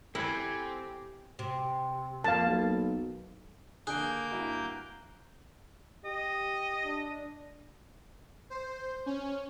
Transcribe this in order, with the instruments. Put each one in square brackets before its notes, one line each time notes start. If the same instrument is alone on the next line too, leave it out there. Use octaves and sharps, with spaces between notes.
[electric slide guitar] C4 [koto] E4 [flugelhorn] G4 [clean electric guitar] A4 F#5 G#5
[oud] C3
[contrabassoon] F2 [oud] A#3 [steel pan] F5 A5
[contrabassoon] B1
[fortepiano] D3 D4 [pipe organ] A#3 G6 [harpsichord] G#4 [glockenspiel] F#6 D7
[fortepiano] G2 E4 F#4 [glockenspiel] A#5
[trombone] G4 [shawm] D#5
[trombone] D4
[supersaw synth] C5
C#4